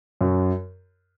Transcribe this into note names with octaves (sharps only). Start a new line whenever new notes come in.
F#2